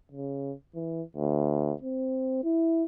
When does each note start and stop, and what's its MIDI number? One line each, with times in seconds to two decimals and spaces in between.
0.11 0.53 49
0.75 1.02 52
1.16 1.73 38
1.82 2.39 60
2.43 2.84 64